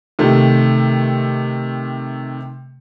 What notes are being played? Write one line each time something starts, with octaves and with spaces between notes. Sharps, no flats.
C3 D#3 A3